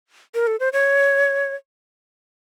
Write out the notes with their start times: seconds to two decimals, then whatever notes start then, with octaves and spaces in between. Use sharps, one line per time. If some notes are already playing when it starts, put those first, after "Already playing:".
0.35 A#4
0.47 A4
0.60 C5
0.73 C#5